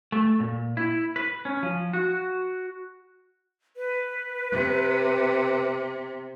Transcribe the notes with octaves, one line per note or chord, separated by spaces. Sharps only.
A3
A#2
E4
B4
C#4
F3
F#4
B4
C3